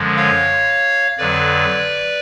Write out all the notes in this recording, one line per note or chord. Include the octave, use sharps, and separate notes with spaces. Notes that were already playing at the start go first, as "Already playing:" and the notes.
Already playing: F#2 D3 F3 G#3
C#5 F5
F2 D3 F#3 B4 D5